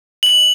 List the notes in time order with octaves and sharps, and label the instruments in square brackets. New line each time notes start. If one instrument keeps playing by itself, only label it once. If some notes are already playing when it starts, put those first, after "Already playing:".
[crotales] F#7